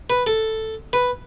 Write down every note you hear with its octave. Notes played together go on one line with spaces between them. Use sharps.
B4
A4
B4